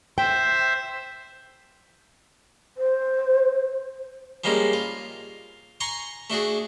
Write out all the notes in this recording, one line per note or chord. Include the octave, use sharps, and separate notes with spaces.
C5 E5 G5
C5
F3 G3 G#3 A#3 C#4
F4
G#5 A#5 C6 C#6
A3 D4 F#4 G#4